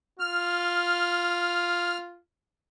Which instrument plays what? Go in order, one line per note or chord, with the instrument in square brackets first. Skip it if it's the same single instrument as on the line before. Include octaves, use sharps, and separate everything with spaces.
[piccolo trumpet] F4 [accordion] F6